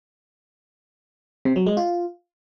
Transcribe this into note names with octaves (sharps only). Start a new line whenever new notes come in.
C3
F#3
G#3
F4